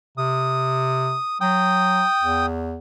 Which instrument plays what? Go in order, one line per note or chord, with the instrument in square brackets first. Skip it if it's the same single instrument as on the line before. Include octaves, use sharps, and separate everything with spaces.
[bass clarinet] C3 [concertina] D#6
[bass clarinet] F#3 [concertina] G5 D#6
[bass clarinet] E2